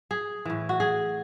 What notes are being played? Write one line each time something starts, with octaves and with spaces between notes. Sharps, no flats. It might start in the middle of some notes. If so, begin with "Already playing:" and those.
G#4
A2 E3
F#4
G#4